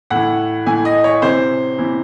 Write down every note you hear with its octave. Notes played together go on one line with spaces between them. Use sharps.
A2 E3 F#5
A2 E3 G#5
D#5
C#5
C3 E3 C5
C3 E3